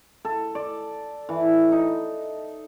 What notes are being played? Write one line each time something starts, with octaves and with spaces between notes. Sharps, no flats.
A4
D5
E3
D#4